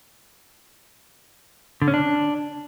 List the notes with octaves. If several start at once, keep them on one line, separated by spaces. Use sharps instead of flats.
D3
C#4
D4